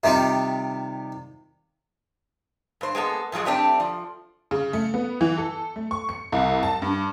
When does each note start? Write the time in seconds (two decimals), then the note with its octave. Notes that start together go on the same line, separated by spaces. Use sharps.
0.03 C3 D#3 G3 F4
2.81 G2 C5
2.95 G#3 A#3 B3 A4
3.32 G#2 F3 F#3 G#3
3.45 G3 A3 C4 D4
3.80 F3
4.51 C#3
4.73 A3
4.94 B3
5.21 E3
5.38 A4
5.76 A3
5.91 C#6
6.09 C#7
6.32 C2
6.63 A5
6.82 G2